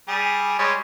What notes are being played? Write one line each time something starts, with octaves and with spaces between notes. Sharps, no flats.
G3 G#4
G3 G#3 C#5